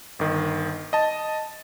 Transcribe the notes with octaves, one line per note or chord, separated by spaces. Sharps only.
G1 D#3
D#5 A5